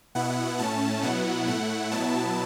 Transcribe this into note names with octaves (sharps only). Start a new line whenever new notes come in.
B2 B3 E4 F#5
A2 A3 C#4 A5
B2 F#3 B3 E4 F#5
A2 A3 E4 F#5
B2 F#3 B3 E4 A5